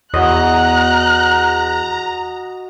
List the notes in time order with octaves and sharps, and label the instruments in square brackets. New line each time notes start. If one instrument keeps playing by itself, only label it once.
[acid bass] E2 [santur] F#4 D#5 [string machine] A#5 [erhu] F#6